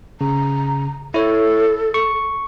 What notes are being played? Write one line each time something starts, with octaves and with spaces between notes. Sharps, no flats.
C#3 A#5
E4 A4 C#5
C#6